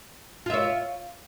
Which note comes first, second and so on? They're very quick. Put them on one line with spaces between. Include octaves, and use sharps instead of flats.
F4 E5 C#5